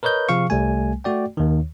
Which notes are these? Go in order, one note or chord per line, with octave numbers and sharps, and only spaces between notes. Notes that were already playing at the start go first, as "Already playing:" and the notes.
A#4 B4 C#5 D#5 G6
C3 F3 G#4 F5 C#6
C2 G3 A3 G#5
A3 F#4 D5 G5
D#2 D#3